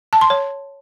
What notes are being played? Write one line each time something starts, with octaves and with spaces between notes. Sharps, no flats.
A5
C6
C#5